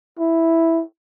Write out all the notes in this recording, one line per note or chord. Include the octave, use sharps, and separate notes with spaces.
E4